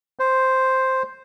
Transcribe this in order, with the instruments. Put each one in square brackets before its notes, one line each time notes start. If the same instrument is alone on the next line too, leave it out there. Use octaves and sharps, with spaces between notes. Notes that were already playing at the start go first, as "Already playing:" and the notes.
[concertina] C5